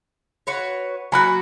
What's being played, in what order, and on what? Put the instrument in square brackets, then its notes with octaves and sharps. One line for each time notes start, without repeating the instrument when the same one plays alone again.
[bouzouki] F#4 B4 C#5
[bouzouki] F#3 A#3 F#4 [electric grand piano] G#5 B5 F#6